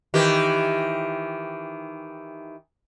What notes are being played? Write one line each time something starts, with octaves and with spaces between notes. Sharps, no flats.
D#3 E3 G4